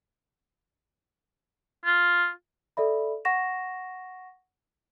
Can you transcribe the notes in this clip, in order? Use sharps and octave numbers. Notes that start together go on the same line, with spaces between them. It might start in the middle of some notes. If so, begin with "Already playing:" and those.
F4
A4 D5 E5 B5
F#5 C#6 A#6 E7